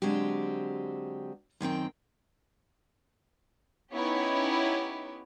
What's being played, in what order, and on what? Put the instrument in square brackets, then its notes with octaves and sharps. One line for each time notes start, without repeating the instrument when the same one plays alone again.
[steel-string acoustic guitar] D3 F#3 G#3 C4 G4
F#2 D#3 C4 G5
[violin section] B3 C#4 D#4 E4 G4 C#5